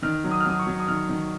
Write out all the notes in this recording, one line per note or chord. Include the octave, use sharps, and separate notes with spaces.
D#3 F6
F#3
D#6
F6
F#3 D#6
C#6
F#3
D#6
D#3 F6
D#3